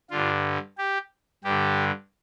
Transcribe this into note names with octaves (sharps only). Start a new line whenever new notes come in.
G2 D3 F4
G4
G2 D3 G4